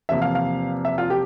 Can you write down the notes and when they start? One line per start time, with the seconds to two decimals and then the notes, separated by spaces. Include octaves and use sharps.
0.09 E2 C3 F3 A#3 E5
0.22 F5
0.35 F5
0.85 E5
0.98 F4
1.10 G4